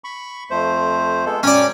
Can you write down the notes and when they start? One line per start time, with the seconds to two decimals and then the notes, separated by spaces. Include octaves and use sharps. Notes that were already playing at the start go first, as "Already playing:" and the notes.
0.04 B5 C#6
0.51 F2 A3 C5
1.26 G#3 B3 A4
1.43 F#2 C#4 D5 G5 A#5